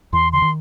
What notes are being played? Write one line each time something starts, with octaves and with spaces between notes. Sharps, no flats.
E2 E3 C6
D3 C6
D#3